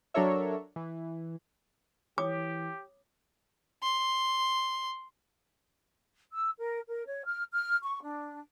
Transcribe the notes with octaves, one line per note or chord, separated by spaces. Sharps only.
F#3 D4 A4 A#4 C#5 E5
E3
E3 G4 C#5 D6 D#6
C6
E6
A#4
A#4
C#5
F6
F6
C#6
D4